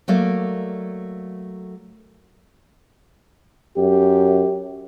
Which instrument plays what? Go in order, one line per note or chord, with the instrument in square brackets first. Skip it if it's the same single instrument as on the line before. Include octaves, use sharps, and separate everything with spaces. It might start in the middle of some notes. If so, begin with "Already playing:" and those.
[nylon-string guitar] F#3 A3 A#3 D5
[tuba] F#2 [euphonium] G4